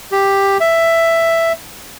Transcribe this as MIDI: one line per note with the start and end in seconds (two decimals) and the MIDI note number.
0.12 0.58 67
0.60 1.53 76